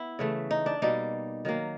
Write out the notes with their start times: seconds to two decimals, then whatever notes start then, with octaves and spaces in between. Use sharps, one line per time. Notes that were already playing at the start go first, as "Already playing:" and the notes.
Already playing: B3 E4
0.19 C#3 E3 A3
0.51 D#4
0.66 D4
0.82 B2 G3 A#3 D#4
1.45 D#3 F#3 A#3